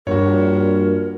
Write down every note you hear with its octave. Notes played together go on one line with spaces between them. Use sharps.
A#1 G2 F#4 A#4 C#5